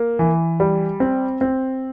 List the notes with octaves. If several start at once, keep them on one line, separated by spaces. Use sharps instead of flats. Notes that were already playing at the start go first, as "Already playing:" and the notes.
Already playing: A#3
E3
G3
C4
C4